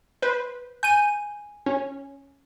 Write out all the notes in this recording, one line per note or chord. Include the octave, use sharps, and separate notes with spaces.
B4 C5
G#5 G6 D#7
C#4